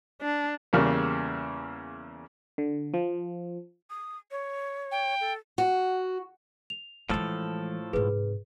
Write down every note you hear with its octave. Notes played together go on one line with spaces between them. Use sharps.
D4
E2 C#3 G3 A#3
D3
F3
D#6
C#5
G5
A4
F#4
F7
A2 E3 F3 G#3 A4
G#2 C3 G#4 B4